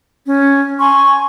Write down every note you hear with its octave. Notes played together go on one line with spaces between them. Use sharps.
C#4
G#5 C6 C#6